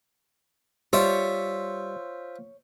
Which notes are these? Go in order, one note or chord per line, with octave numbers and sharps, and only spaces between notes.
G3 F4 C5 C#5 E5